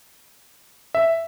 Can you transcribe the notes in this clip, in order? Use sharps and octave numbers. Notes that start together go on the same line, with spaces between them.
E5